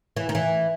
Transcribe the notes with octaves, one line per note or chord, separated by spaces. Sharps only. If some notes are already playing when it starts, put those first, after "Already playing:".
E3
D#3
E3